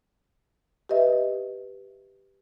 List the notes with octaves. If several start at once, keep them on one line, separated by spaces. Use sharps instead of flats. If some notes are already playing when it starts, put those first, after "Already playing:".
G4 B4 D#5 E5